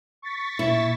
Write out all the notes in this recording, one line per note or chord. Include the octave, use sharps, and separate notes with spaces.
C#6 A6 B6
A#2 E4